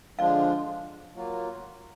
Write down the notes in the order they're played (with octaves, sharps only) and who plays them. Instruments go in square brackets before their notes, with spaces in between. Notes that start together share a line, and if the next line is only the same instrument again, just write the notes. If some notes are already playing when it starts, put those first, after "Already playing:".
[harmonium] D3 F3 G#3 D4 F4 [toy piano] D5 F5
[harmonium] F#3 A#3 F4